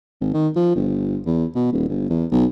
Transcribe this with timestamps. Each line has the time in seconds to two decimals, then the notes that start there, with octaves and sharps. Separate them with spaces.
0.21 G#1
0.34 D#3
0.56 F3
0.76 G1
1.26 E2
1.55 B2
1.72 D#1
1.88 G1
2.10 E2
2.31 B1